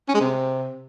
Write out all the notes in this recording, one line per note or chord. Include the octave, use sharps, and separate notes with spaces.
C#4
G#3
C3